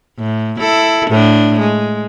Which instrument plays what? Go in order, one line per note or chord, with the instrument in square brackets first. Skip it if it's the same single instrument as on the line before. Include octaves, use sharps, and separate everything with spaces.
[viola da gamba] A2
E4 A4
A2 D4
G#3